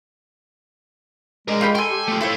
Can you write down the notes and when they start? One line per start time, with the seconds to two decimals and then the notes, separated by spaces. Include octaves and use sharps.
1.48 G#3 D4 A#4
1.61 F4 G4 B5
1.75 A4 G5 G#5 C6
1.91 G4
2.08 A3 F4
2.21 E4 F4 A4 C5 C#5